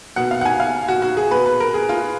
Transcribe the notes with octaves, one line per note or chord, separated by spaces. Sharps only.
B2 F#5
F5
F#5
G#5
F5
F#4
F#4
G#4
B2 B4
B4
A#4
G#4
F4